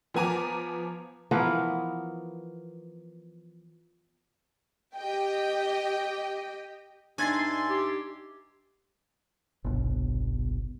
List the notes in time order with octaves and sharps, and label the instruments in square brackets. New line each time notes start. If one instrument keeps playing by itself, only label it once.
[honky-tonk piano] F3 B3 G#5 A#5 D6
[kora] E3 F3 B3 A#4
[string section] G4 D#5 G5
[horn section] G2 E5 C6 [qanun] D4 D#4 [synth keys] G#5 G#6 A6
[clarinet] G4
[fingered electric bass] G1 C2 B2